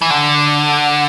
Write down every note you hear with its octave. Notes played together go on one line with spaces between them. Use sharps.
E3
D3